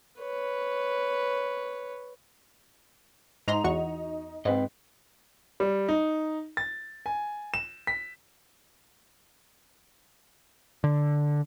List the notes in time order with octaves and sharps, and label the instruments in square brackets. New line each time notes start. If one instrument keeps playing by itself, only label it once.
[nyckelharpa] B4 C#5
[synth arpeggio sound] G#2 A#5 C6 [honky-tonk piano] D#4 F7
[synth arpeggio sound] E2 F#4 C#6
[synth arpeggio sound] G#2 [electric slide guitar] C4 B4 D#5
[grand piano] G3
D#4
A6
G#5
E7
B6
[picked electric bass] D3